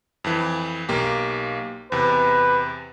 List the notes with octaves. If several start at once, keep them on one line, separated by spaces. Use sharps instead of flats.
F2 E3
B1 A#3 G4
E2 C3 B4